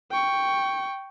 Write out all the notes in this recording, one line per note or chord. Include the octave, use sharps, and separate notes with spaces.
G5 C#6